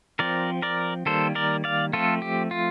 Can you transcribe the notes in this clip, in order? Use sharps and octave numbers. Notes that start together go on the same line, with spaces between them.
F3 C4 A#4 D5
A#4 D5
D#3 G3 A#3 A4 C5
A#4 D5
D5 F5
F3 A3 C4 F4 A4
G4
F4